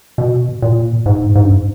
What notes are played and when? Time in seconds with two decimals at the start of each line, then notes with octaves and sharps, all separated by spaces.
0.18 B2
0.62 A#2
1.06 G#2
1.36 G#2
1.44 G2